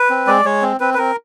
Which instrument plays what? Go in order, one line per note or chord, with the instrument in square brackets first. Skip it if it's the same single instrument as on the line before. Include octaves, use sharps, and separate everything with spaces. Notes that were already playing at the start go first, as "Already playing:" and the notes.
Already playing: [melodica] B4
C4
G#3 D5
G#3 C#5
C4
C4 B4
B4
C4 A#4